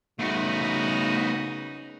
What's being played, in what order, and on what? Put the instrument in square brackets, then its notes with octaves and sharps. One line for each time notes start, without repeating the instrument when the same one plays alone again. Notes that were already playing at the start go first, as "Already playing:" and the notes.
[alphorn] C#3 [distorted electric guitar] A3 B3 [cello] D#4 F#4